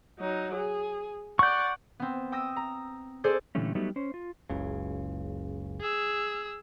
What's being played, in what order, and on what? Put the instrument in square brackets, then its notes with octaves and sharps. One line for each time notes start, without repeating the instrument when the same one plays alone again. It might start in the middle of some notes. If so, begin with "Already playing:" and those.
[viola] F#3 D#4
G#4
[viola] D5 F#5 [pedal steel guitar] C#6 G6
[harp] B3 C4
G5 D#6 E6 A#6
A#5
G#4 A4 C5 D5
[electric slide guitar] A#2 D3 E3 G3 A3 C#4
F#3 G3 A3 B3 D#4 G4
C#4 C5
F4
[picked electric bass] F#1 C#2 C#3
[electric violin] G#4 E6